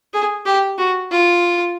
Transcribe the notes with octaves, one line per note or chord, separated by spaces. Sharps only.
G#4
G4
F#4
F4